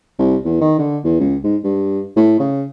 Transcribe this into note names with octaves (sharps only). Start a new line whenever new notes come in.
C2
E2
D#3
D3
E2
C#2
G#2
G2
A2
C#3